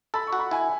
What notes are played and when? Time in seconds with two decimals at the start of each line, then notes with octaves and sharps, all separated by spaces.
0.14 A4 B5
0.27 C#6
0.33 F#4
0.39 B5
0.51 E4 G#5